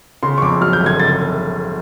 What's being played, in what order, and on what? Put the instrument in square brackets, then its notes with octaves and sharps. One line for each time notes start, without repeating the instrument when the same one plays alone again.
[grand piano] C#3 C6
C#6
F2 D6
F#3 F6
G6
G1
G#6
C#3 A6